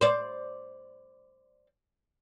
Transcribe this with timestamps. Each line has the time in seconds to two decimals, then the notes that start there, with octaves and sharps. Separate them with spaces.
0.01 C5 D5